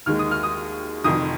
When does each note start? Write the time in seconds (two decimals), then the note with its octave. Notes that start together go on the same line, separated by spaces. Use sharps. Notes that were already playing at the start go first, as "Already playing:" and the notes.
0.06 D#2 D#3 G#3 F6
0.19 D#6
0.31 F6
0.43 D#6
1.04 F1 F2 D#3 D#6